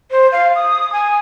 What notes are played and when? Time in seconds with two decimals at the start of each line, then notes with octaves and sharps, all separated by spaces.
0.11 C5
0.32 F5
0.55 D#6
0.93 G#5